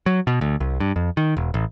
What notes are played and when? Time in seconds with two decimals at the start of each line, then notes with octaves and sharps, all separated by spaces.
0.06 F#3
0.27 B2
0.41 D2
0.60 C2
0.80 G2
0.96 F2
1.17 D#3
1.37 E1
1.54 A1